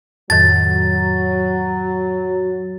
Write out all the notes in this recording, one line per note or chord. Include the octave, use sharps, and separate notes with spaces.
F2 A2 D#3 F#3 A6